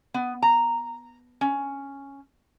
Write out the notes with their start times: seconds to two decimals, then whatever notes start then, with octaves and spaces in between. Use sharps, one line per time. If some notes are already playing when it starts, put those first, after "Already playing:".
0.14 B3
0.42 A#5
1.41 C#4